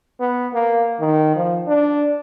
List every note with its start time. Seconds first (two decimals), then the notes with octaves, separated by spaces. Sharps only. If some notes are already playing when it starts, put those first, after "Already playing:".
0.20 B3
0.54 A#3
1.00 D#3
1.36 F3
1.67 D4